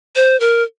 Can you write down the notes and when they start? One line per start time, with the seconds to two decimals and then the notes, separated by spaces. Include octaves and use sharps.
0.16 C5
0.40 A#4